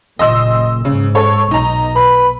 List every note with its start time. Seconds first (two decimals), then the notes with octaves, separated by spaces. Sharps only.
0.19 F#1 A#2 D#5 C6 E6
0.85 G#2 C#3
1.15 A4 C#5
1.51 B1 D#4 A#5
1.96 B4 B5